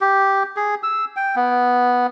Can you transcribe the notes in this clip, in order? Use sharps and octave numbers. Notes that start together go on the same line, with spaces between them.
G4
G#4
E6
G5
B3